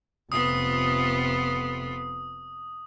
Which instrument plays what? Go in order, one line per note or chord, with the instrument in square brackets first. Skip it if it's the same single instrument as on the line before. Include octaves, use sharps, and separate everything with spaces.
[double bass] F1 C3 [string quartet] B3 F4 [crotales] D#6